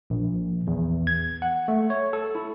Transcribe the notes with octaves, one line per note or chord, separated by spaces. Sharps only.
A#1
E2
G#6
F#5
A3
C#5
A4
E4